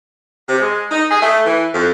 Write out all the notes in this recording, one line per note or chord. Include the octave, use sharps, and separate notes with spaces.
C3
G#3
D#4
G#4
A3
E3
F2